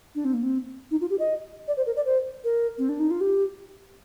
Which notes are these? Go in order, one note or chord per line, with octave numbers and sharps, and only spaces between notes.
D4
C4
A#3
C4
D#4
F4
G4
D#5
D5
C5
A#4
D5
C5
A#4
C4
D4
D#4
F4
G4